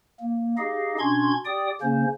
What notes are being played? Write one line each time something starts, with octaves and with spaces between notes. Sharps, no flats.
A#3
D#4 G4 G#4 D#5 F5
B2 C#4 D4 C6 C#6 G#6
G4 D5 G5 D#6
C#3 A#3 C#4 C5